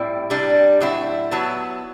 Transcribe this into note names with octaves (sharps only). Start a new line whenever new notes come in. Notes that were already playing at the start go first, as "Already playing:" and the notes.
Already playing: A2 G3 C4 E4
C3 G3 D4
A2 F#3 C4 E4
F#3 B3 E4 A5